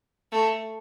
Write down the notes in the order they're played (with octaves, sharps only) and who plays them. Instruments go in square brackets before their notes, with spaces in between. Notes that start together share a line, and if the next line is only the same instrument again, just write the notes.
[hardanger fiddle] A3